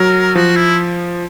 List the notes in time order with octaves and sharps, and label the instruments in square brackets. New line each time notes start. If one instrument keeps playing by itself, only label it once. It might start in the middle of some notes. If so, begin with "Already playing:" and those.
Already playing: [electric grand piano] F#3 [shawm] A#4
[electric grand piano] F3 [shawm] F#4
[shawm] E4